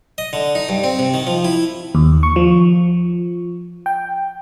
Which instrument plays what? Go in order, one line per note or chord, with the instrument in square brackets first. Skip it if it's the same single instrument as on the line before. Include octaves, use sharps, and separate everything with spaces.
[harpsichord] D#5
D3
D#4
G2
C4
C3
D#3
F3
E4
[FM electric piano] D#2
C#6
F3
G5